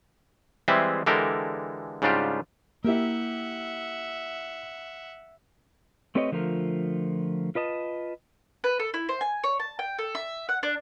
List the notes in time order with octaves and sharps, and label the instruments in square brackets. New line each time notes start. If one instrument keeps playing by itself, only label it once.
[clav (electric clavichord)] E3 G3 G#3 C4 G#4 E5
D3 E3 G#3 G4 A4 A#4
G#2 C#3 G3 D4 F4 G4
[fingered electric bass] A#3 [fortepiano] E4 G4 A#4 [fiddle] E5 F#5
[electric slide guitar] A3 C4 G4 B4 C#5 D#5
D3 F3 A3 F4 A#4
F4 B4 D#5 A5
[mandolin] B4
A4
E4
C5
G#5
C#5
A5
G5
A4
E5
F#5
D4